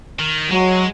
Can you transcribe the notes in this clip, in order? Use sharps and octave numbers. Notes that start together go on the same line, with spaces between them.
D#3
F#3 G#3